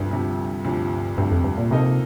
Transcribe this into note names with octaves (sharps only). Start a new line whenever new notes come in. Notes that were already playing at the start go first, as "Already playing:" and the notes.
Already playing: D2 G2 C3 F3
D2 C3 F3
D2 C3 F3
D2 G2 C3 F3
F2
G2
A#2
C3 F3 A#3 D#4 A4 D#5